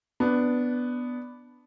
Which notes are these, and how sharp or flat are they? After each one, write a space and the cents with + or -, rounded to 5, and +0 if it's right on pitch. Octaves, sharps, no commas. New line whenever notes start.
B3 +5 D4 +0